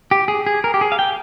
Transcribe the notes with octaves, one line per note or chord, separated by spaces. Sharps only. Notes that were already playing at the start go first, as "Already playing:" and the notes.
G4
G#4
G#4
A#4
G4
G#4
F5
G5